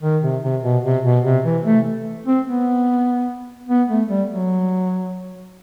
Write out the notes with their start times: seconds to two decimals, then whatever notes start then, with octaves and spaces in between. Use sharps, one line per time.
0.03 D#3
0.23 C3
0.43 C3
0.63 B2
0.84 C3
1.05 B2
1.25 C3
1.45 E3
1.65 A3
2.26 C4
2.47 B3
3.69 B3
3.89 A3
4.09 G3
4.30 F#3